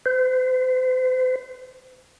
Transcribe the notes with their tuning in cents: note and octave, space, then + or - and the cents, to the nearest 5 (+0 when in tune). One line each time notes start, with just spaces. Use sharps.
C5 -40